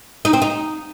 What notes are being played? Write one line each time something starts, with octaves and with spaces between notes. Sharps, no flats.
D#4
C4
D#4